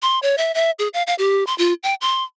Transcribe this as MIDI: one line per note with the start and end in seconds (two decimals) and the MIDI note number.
0.02 0.19 84
0.22 0.36 73
0.38 0.52 76
0.55 0.71 76
0.79 0.88 68
0.94 1.03 77
1.07 1.15 77
1.18 1.46 67
1.47 1.56 84
1.58 1.73 65
1.83 1.94 79
2.01 2.24 84